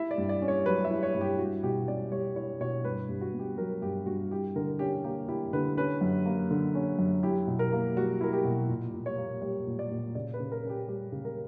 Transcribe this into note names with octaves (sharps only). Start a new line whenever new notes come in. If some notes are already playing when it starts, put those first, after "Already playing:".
Already playing: E4 E5
D5
G2
D5
C#4
C#5
F#3 B4
E5
E4
C#5
G2
G4
E4 F#4
B2 G4
C#4 D5
G3 C#5
E4 C#5
B2 C#5
G2 B4
G2
F#4
B3
G4
F#3 A#4
G2 G4
G2 F#4
E4 G4
D3 A#4
C#4 G4
A#3 G4
E4 G4
D3 B4
C#4 B4
F#2
A#3
D3
C#4
F#2
E4 G4
B2
A#4
A#3
G3 F#4
E4 A#4
G4
B2
A#2
A#2
C#5
A#3
G3 C#5
A#2
D5
A#2
C#3 D5
B4
C#3
A#4
C#4
G4
G3 G4
C#3
A#4